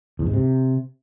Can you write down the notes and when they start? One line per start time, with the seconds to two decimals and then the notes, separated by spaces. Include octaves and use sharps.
0.19 E2
0.26 G#2
0.33 C3